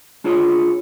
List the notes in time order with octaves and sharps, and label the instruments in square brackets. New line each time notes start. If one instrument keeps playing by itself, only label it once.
[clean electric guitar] D4 F4 G#4 C#5